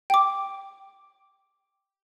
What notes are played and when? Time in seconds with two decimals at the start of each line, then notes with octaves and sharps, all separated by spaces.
0.10 G5 D6